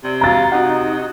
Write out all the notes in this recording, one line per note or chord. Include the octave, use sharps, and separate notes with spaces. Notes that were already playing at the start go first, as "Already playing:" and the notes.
C3 D5
F5 A#5 A6
C3 D#4 F#4